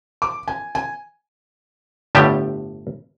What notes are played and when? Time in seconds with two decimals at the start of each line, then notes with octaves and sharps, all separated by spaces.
0.22 D6
0.48 G#5
0.75 G#5
2.15 G1 A2 D3 G3 G4 A5